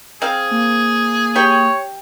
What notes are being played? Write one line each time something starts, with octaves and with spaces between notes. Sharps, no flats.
C4 G#4 F5
A#3
G4 C#5 G5